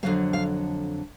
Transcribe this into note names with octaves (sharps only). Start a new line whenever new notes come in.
F2 D3 F#3 A#3 F5
F5